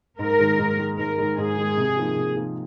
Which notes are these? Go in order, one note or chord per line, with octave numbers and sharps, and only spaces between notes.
G#2 A#4
D#3 G#3
G#2
D#3 G#3
G#2 A#4
D#3 G#3
G#2 G#4
D#3 G#3
C3
F3 A#3 D#4
C3
F3 A#3 D#4